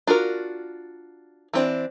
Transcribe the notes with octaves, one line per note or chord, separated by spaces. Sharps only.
D4 F4 F#4 A#4
E3 C4 D4